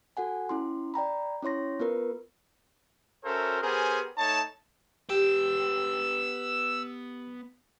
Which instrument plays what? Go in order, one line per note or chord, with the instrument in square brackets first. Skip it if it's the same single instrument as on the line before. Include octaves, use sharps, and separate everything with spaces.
[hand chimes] F#4 A4 F#5 G#5
C#4 E4 C6
D5 G5 A#5 B5
C#4 E4 C#5 C6 A#6
B3 F4 A#4 B4
[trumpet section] C#4 F#4 A4 A#4 C5 E5
B3 G4 G#4 A#4 C5 G#5
A3 D#4 C#5 A5
[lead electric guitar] B3 G5 [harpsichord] G4 [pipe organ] E6